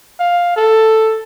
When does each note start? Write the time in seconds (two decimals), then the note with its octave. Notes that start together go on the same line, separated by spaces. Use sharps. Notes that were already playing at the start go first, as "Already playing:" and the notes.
0.20 F5
0.56 A4